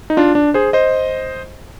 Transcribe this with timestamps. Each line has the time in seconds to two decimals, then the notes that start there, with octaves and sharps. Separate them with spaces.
0.10 D#4
0.17 D4 F4
0.35 D4
0.54 G#4 C5
0.73 C5 D#5